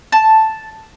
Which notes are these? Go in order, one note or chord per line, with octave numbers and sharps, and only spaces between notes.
A5